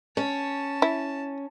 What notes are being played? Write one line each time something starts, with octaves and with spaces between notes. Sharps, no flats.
C#4 A5
E4